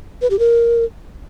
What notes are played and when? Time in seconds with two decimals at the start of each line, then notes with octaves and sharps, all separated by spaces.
0.22 B4
0.30 G4
0.39 A#4